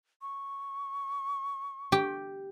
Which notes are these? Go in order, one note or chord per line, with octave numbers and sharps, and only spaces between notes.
C#6
G4